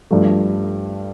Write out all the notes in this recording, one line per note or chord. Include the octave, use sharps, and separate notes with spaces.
G2 F3 A3